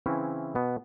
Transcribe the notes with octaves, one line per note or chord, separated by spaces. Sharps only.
C#3 E3 C4 C#4 E4
B2 B3